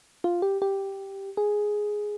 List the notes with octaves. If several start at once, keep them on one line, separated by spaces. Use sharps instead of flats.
F4
G4
G4
G#4